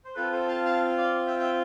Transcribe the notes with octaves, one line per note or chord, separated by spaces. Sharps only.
C5
C4 F4 A4 B4
A4 C5
F5 A5
F5 A5
D5 F5
E5 G5
E5 G5